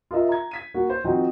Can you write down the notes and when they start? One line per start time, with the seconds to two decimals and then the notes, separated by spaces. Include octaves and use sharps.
0.11 F4 A#4 D#5 E5
0.28 A#5 G#6
0.51 G#6 B6 D#7
0.74 A#3 F#4
0.90 C5
1.04 D#3 F3 C4 D#4 F#4